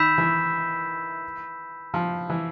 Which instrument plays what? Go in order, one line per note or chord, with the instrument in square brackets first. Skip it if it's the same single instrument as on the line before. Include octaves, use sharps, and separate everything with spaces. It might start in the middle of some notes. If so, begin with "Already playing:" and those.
Already playing: [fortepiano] D#3 [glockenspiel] B5 E6 G6 B6 E7
[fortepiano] E3
F3
E3